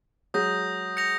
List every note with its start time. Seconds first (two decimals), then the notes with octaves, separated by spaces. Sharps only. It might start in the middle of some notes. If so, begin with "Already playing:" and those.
0.34 F#3 G#3 D#6 G6 A#6
0.97 G6 A#6 C#7 F7